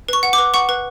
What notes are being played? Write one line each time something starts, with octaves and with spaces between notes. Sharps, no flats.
B4 C#6
F#5
D6
B4
F#5 C#6
B4